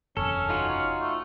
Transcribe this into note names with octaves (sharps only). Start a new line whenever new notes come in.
F#1 E2 C3 C#4 A4
D#4 F4 F#4
C#4
A3